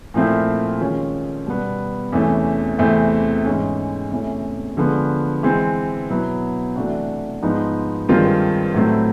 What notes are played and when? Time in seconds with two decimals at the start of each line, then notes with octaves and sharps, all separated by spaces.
0.14 A#2 F3 A3 C4 E4
0.81 D#3 G#3 C#4 F4
1.46 B2 G3 B3
2.12 E2 C3 E3 A3 C#4
2.78 E2 C3 E3 A3 C4
3.45 G#2 E3 G#3 C#4
4.11 E2 C3 E3 A3 C#4
4.77 D3 F3 G#3 B3
5.43 E3 G#3 C4
6.09 B2 F#3 B3 E4
6.76 C3 E3 A3 D4 F#4
7.42 G#2 F3 G#3 B3 D#4
8.09 G2 D#3 G#3 C4 F4
8.74 A2 F#3 A3 C4 E4